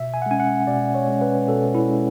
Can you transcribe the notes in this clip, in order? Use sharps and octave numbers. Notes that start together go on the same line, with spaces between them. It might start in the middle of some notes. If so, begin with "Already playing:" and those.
Already playing: B2 E5
G#5
F#5
G#3 C#4 G#5
F#5
B2 D5
C#5
G#3 C#4
B4
B2 A4
E4
G#3 C#4